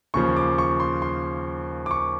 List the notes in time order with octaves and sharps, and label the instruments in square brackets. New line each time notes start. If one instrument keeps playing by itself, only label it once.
[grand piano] D#2 C#3 F3 C#6
D6
C#6
C6
C6
D6
C#6